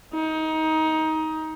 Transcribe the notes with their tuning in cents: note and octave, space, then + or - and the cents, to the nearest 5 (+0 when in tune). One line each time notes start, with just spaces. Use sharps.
D#4 +20